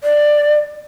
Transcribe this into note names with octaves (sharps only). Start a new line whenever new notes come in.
D5